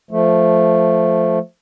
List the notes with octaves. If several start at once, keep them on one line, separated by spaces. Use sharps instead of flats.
F3 A3